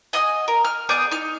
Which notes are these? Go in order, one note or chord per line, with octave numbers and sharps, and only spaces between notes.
D#5 F#5 G#5 D#6
A#4
F6
B3 G#4 D5 G6
D#4 F6